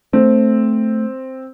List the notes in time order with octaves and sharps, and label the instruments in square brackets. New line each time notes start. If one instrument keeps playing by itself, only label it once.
[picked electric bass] A3 [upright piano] C4